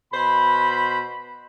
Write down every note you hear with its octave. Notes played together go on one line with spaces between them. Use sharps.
B2 C5 B5